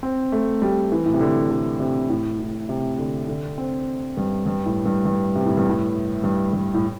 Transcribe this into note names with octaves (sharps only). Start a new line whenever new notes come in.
C4
A3
G3
E3
A2
C3
D3
D3
C3
A2
A2
C3
D3
D3
C4
G2
G2
A2
G2
G2
C3
A2
G2
A2
G2
G2
A2